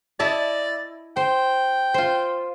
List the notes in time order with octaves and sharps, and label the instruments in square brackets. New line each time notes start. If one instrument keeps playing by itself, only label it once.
[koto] E4 D#5 A5 [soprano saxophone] D5
[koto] C5 [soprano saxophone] G5
[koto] F4 C5